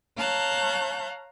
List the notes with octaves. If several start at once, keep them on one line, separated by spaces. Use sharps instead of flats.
C#5 F5 A5 A#5 F#6 G6